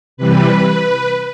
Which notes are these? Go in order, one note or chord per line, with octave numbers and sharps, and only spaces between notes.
C3 E3 G3 B4